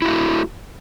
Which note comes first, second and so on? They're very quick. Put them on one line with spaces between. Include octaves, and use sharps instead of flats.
E4 F#4 A3